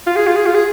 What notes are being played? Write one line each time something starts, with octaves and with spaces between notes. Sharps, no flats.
F4
G#4
F4
G#4
F4
G#4